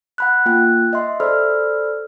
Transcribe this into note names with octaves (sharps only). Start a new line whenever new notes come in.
F#5 B5 F#6
A#3 F4 G5 F#6
D#5 E5 C6
A4 C5 D5 B5 E6 F6